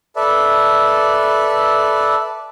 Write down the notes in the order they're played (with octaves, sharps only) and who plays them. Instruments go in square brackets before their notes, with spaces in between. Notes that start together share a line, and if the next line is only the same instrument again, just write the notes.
[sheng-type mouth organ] A4 B4 D5 E5